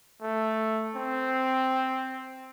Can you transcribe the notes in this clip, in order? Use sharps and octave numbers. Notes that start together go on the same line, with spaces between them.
A3
C4